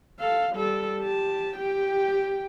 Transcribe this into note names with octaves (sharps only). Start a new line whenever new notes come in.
A4 F5
G3 A4
G4 A5
G4 G5